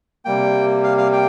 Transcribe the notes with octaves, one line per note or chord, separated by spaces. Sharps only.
C3 G3 A#3 G5
F5
F5
G5